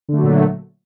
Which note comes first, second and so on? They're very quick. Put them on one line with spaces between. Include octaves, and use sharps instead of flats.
D3 A3 F#3 A#2